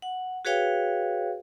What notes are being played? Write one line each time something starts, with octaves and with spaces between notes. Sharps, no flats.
F#5
F#4 G#4 B4 C#5 F5 G5